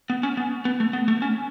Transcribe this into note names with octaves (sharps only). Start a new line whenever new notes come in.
B3
C#4
B3
B3
A3
B3
A3
C#4